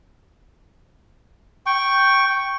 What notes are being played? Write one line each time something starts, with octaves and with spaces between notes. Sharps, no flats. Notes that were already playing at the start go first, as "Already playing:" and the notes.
G5 C#6